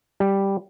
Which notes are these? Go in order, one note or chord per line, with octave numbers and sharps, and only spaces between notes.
G3